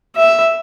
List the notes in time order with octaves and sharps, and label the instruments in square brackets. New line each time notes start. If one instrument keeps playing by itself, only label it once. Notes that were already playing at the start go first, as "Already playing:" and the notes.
[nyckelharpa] E5